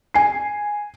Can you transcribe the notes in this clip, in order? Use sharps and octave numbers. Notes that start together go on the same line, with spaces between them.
G#5 C7